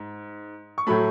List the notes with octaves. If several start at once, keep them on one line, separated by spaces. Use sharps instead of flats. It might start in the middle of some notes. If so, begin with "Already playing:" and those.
Already playing: G#2
C#6
A2 F#3 A3 B5